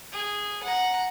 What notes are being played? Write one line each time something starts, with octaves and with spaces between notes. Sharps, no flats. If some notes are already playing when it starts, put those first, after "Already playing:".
G#4
F#5 A#5